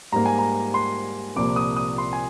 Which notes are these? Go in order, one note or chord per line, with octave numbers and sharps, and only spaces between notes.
G#2 G3 A#3 A#5
G#5
A#5
C6
C2 A#2 F3 A#3 D6
D#6
D#6
C6
G#5